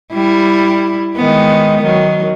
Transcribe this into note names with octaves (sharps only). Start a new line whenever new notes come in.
G3 E4
D#3 G#3 B3
D#3 F#3